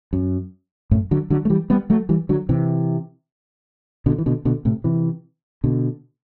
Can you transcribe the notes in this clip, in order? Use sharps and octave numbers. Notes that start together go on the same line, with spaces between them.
F#2
F#2 A2
D3 F#3
D3 F#3
A3
E3 G3
G3 B3
F#3 A3
E3 G3
D3 F#3
C3 E3
B2 D3
E3
B2 D3
B2 D3
A2 C3
C3 E3
B2 D3